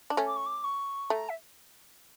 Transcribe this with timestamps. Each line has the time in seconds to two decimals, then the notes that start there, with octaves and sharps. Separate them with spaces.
0.10 D4
0.17 A3 C#4
0.27 D6
0.36 C#6
0.46 D6
0.64 C#6
1.10 A3 A#5
1.29 E5